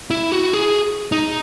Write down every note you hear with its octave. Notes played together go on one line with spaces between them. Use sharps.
E4
F#4
G#4
D#4